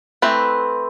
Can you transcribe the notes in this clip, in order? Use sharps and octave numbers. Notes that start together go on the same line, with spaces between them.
E3 A3 C4 B4